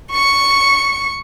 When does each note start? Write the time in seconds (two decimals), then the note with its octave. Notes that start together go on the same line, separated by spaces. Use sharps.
0.11 C#6 C#7